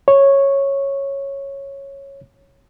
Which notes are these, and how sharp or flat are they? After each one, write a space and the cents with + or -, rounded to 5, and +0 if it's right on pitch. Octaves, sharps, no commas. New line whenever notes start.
C#5 -10